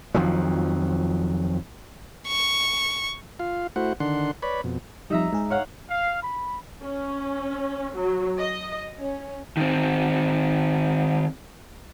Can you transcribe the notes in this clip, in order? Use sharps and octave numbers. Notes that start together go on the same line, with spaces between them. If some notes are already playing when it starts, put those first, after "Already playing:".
F2 D#3 F3 F#3
C#6
F4 F5
A3 E4 F#4 C5 F#5
D3 D#3 D4 F#5 C6
B4 C#5 D5 B5
F2 B2
F2 G3 D#4 E5 A#5
G#2 G#4
C#5 F5 F#5
F5
B5
C#4
F#3
D#5
C#4
D#3 C4